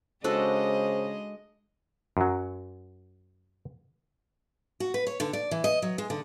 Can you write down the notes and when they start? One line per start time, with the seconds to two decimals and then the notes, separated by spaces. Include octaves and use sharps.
0.24 C#3 G#3 D4 F#4 A4 C5 D#5
2.17 F#2 F#3
4.80 F#4
4.94 B4
5.07 C#5
5.20 D3
5.33 D5
5.51 E3
5.64 D#5
5.82 F#3
5.98 G#3
6.10 D3